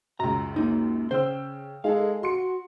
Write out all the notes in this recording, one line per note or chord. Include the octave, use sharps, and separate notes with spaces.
C#2 F#2 A#5
A#3 D#4
C#3 C5 G5 E6
G#3 D#4 G#4 A4 F5
F#4 C6 C#7